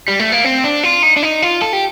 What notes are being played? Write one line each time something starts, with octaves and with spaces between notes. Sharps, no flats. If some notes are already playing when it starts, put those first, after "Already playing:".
G3
A3
A#3
C4
D4
F4
D#4
D4
D#4
F4
A4
G4